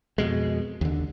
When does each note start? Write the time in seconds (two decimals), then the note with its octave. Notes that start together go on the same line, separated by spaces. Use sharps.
0.18 F2 B2 G#3
0.81 D#2 D3